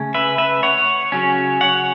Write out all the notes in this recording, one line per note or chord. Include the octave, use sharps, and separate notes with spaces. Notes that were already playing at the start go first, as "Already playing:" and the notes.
Already playing: C#3 A3 C#4
B4 E5
B4 E5
C#5 F#5
C#3 F#3 C#4
C#5 F#5